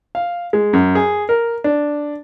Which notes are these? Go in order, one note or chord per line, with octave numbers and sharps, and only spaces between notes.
F5
G#3
F#2
G#4
A#4
D4